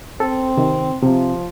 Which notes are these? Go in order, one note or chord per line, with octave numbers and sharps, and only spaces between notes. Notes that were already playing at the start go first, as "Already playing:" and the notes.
C4 A4
C3 D#3
C3 F3